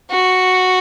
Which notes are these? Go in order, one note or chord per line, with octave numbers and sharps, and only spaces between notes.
F#4